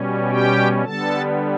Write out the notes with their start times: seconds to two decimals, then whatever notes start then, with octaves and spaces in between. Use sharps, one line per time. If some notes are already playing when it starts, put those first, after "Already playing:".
Already playing: B2 G3 C#4
0.31 G4 G5
0.84 D3 G3 B3 A4 A5